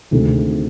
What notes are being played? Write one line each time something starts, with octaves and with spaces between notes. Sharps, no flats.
D2 C3 D#3 G#3